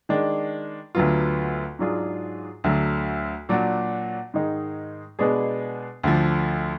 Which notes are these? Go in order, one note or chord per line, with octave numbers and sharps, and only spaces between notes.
D#3 G#3 D4
D2 D3 F#3 B3 F4
G#2 F#3 D4 F4 G#4
D2 D3 F#3
A#2 F#3 D4 F#4
G#2 D#3 G#3 D#4
B2 G#3 B3 D4 G#4
D2 D3 F3